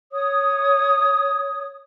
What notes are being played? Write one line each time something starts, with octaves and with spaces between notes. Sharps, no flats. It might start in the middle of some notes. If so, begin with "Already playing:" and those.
C#5 D#6